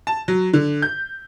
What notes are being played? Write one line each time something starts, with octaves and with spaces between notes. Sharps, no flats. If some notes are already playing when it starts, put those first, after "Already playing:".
A5
F#3
D3
G6